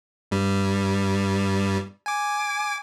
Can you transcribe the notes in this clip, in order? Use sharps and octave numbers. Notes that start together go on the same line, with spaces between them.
G2 G3
G#5 D6